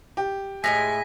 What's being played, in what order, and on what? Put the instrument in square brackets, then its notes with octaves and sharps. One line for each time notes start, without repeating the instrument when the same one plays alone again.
[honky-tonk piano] G4
[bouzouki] A2 G3 G#3 [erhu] G#5 [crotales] A#6 B6